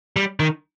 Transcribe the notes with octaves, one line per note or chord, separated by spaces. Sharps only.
G3
D#3